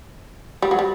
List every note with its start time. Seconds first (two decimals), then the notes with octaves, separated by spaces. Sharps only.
0.62 G3
0.71 F#3
0.79 G3